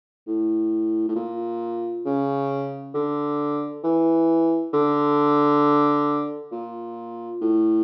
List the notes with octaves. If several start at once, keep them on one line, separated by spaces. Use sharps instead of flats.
A2
A2
A#2
C#3
D3
E3
D3
A#2
A2